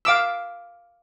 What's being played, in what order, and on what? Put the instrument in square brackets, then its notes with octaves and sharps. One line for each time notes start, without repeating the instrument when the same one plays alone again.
[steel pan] F5 D6 E6